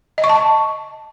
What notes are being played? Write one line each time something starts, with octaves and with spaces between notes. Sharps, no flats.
D#5
C#6
A5
C#6